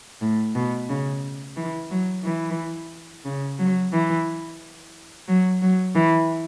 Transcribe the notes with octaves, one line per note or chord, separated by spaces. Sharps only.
A2
B2
C#3
E3
F#3
E3
C#3
F#3
E3
F#3
F#3
E3